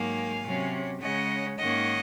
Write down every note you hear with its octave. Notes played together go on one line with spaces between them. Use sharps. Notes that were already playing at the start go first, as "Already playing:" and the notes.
Already playing: G#2 D#3 F#3 A#3 F5 G#5
C3 F#3 C#4
C#3 G#3 C#4 D#5 F#5
G#2 D#3 A#3 C#4 D#5 F#5